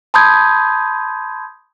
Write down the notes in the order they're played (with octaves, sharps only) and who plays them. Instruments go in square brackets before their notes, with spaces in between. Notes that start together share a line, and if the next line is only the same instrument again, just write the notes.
[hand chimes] A5 B5 C6 D#6 G6 G#6